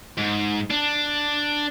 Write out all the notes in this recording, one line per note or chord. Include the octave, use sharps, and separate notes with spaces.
G#2
D4